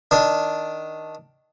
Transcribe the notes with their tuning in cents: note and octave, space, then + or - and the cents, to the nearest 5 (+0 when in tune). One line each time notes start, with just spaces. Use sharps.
D#3 +10 D4 +0